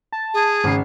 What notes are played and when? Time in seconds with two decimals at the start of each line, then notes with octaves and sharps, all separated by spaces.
0.12 A5
0.34 G#4
0.64 G#1 C#3 C7